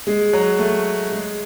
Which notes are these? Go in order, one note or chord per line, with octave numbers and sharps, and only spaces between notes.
G#3
F#3
A3
G#3